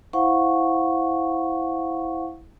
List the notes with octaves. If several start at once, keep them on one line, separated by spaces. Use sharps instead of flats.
E4 C5 F5 F#5 C#6